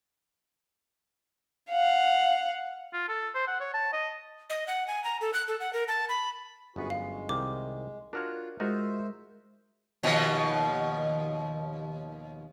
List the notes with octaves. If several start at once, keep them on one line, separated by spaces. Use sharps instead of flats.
F5 F#5
F4
A4
C5
F#5
C#5
A5
D#5
D#5
F#5
G#5
A#5
A4
F#6
A4
F#5
A#4
A5
B5
G1 F#2 B3 F#4 G#4 B4
G#3 F5
C2 D#3 D6
D4 F4 F#4 A#4 C#5 F6 F#6
G#3 D#4 F4 F#4 A#4 C5 E5
D#2 B2 F3